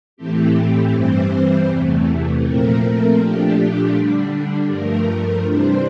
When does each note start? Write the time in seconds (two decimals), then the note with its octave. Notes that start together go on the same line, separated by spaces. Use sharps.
0.17 A2 E3 A3 C4 G4
0.92 G2 E3 G3 C4 C5
1.68 E2 C3 E3 A3
2.42 A#2 F3 A3 C4 A#4
3.18 A#2 F3 A3 D4 G4
3.93 D3 G3 D4
4.68 G2 F3 A3 A#4
5.43 C3 E3 G3 D4 C5